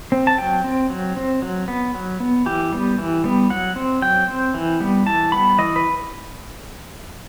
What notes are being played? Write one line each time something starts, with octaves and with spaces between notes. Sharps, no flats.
C4
A5
F#3 G5
C4
F#3
C4
F#3
B3
F#3
B3
E3 G4
G3 B3
E3
G3 B3
F#3 F#5
C4
F#3 G5
C4
E3
G3 B3
E3 A5
G3 B3 B5
E3 D#5
B4